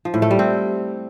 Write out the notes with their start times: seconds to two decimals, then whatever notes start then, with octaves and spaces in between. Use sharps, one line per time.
0.05 F3
0.14 A2
0.22 A3
0.31 G3
0.39 C4